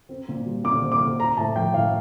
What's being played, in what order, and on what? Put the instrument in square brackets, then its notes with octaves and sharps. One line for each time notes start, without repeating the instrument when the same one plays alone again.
[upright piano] C4
A#2
G3
A#2 D6
C4
D6
A#2
C4 A#5
A2 A5
F3 G5
A2 F5